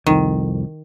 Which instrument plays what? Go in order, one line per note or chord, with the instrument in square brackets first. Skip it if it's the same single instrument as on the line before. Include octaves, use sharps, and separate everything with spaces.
[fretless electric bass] C2 F2 [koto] D#3